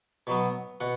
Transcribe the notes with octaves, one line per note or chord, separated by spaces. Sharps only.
B2 F#3 B3
B2 F#5